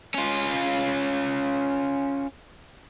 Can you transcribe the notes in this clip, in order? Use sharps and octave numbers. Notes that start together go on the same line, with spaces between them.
C#4 F4